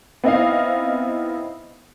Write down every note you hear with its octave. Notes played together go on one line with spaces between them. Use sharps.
B3 C4 D#4 E4 D#5 F5